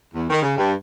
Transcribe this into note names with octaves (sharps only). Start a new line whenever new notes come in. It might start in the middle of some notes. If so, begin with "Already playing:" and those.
E2
D#3
C#3
G2